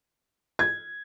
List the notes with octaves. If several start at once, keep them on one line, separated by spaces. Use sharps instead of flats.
G#6